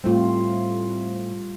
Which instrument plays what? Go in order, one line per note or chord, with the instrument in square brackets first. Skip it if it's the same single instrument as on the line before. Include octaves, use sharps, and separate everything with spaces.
[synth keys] A2 A3 C4 [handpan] G3 F4